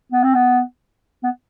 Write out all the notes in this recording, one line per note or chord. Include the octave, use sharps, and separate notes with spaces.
B3
C4
B3
B3